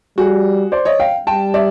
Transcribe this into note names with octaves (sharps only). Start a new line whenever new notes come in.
G3 F#4 G#4
C5 D5
C#5 D#5
F5 G5
G3 G5 A5
D5 E5